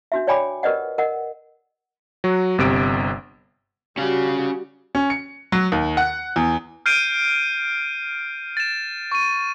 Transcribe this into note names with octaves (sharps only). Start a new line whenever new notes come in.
D4 F#4 E5
C#5 D5 G5 G#5 B5 D6
G4 A#4 B4 D5 D#5 F#5
A#4 D#5 F#5
F#3 F#4
G1 C3 D7
G3 C#4 F#4 F5
C#4
C#7
F#3
D#2
F#5
E2
F6 G6 C7 D7 D#7
A6 E7
C#6 D#7